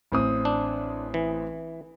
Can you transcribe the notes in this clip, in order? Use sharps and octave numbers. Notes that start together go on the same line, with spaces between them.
A1 C4 D#6
D4
E3